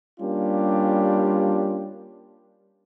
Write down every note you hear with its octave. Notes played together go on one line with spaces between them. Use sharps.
G3 A#3 C#4 D4 F4 G4